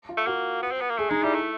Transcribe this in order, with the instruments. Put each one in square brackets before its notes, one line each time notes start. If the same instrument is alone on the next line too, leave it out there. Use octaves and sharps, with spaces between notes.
[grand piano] F4
[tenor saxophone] A3
[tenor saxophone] A#3 [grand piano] F#4
[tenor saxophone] B3
C4
B3
A#3
[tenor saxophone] A3 [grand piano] G#4
[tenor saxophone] G#3 [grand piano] D#4
[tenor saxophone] G3 [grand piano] E4
[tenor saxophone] A3